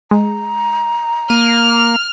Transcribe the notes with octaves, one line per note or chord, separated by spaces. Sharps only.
G#3 A#5
A#3 F6 D#7